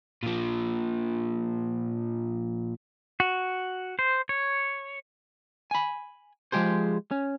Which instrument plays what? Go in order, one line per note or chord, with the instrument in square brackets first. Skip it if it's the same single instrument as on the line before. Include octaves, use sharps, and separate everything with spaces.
[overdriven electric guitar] A#2 F3
[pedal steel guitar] F#4
C5
C#5
[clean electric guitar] G#5 B5
F3 G#3 G4 G#4 C5
C#4